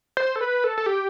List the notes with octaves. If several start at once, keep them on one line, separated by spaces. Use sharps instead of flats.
C5
A4
B4
A4
A4
G4